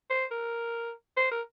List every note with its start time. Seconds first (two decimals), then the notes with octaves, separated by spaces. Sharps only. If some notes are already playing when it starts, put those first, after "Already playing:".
0.10 C5
0.31 A#4
1.17 C5
1.31 A#4